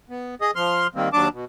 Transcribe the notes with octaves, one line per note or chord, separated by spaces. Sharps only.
B3
G#4 D#5 D#6
F3 C6 F6
D#3 G3 A#3 C4
D#2 F#3 D4 A5 D6
B2